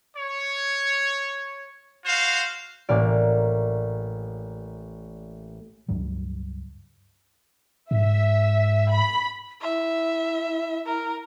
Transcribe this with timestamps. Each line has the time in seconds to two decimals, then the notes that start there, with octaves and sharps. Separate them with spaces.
0.17 C#5
2.05 F#4 C5 F5
2.89 A1 A#3 D5
5.89 C#2 G2 F#3
7.91 G#2 E5
8.90 B5
9.62 E4 E5
10.87 A#4